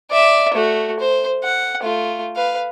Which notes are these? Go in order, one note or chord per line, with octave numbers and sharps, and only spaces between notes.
D5 E5
A3 F#4
C5
F#5
A3 F4
B4 F5